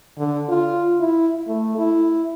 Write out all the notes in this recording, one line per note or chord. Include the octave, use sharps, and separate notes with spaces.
D3
F4
E4
A3
E4